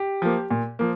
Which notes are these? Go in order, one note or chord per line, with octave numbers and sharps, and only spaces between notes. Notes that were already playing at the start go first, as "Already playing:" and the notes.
Already playing: G4
F3 A#3
A#2
F3 A#3